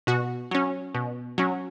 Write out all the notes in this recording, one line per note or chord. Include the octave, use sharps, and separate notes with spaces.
B2 F#4
F#3 C#4
B2
F#3 C#4